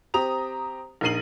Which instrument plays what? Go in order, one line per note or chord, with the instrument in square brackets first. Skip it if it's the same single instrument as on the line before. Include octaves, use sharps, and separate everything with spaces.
[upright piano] C4 G4 A#5 D#6 F7
A#1 D#4 A#4 C7 D#7 F#7